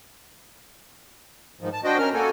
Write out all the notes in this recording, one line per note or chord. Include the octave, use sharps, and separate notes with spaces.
G#2 D#3 F3
A5
D4 F#4 C5 D#5 G5
C#4 A#4 F6
A#3 F#4 A4 G#5